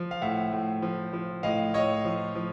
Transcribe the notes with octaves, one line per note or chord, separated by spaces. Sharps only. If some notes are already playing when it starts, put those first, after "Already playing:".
Already playing: F3
F5
A2 E5 F#5
A2
F3
F3
A2 D#5 F5
A2 C#5 D#5
F3
F3